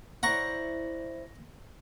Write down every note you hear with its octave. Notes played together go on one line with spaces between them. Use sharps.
E4 C5 D5 F#5 A#5 C#6